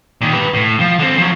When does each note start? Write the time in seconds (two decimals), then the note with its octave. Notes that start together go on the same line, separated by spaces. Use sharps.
0.21 A#2 D#3
0.33 G4 B4
0.54 A2
0.80 F3
0.99 D3 C4
1.18 F3 F#3